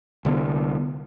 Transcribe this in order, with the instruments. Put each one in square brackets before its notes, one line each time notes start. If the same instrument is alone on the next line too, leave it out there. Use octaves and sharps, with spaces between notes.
[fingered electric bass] C2 D3 B3